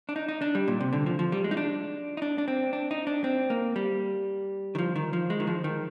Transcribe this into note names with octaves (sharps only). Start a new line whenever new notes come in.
D4
D#4
D#4
D4
G3
A#2
C3
D3
F3
F3
G3
G#3
D#4
D4
D#4
D4
D4
C4
D4
D#4
D4
C4
A#3
G3
D#3
F3
D#3
F3
G#3
D#3
F3
D#3